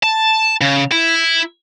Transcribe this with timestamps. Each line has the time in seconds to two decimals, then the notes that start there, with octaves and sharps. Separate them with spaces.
0.03 A5
0.61 C#3
0.92 E4